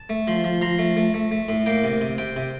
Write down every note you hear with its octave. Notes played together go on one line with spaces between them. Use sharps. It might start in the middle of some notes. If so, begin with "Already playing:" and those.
Already playing: A5
A3
F3
F3
F3 A#5
A3
A3
A3
A3
A2
A#3 G5
C3
C3
C3 G5
C3